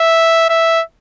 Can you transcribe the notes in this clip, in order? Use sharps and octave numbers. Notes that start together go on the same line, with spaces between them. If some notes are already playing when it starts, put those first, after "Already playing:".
Already playing: E5
E5